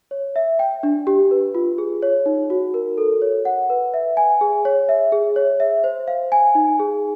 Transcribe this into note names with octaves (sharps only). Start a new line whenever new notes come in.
C#5
E5
G5
D4
G4
B4
F4
G#4
C#5
D#4
F#4
A#4
A4
C#5
F#5
B4
E5
G#5
G#4
C#5
E5
G#4
C#5
E5
C5
F5
G#5
D#4
G#4